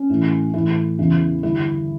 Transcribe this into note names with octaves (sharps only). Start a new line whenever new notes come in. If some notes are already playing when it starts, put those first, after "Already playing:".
Already playing: C#4
A2 E3
A2 E3 E4
E2 C#3 E3
G2 D3 E4